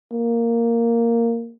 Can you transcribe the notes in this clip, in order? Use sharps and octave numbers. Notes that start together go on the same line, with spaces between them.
A#3